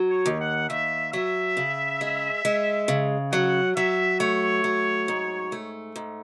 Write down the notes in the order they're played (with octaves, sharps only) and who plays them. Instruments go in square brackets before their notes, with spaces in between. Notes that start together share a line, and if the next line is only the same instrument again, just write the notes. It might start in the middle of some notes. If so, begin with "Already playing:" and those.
Already playing: [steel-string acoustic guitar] F#3
[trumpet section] C#5
[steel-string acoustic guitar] D#2
[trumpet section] F#5
[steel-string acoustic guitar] D#2 [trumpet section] E5
[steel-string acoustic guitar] F#3 [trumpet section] E5
[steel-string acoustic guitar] C#3
G#3
G#3
C#3
[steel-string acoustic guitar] F#3 [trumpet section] F#5
[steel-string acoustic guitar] F#3 [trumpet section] E5
[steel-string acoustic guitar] A3 [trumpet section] C#5
[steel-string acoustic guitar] F#3
G#2
A3
G#2